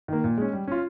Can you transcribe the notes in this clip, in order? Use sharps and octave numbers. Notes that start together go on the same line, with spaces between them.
D#3 A#3
A#2
G#3 C#4
G3
C#4 F4